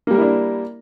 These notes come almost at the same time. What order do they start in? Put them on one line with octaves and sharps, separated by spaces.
A#3 G3 A#4 E4 D4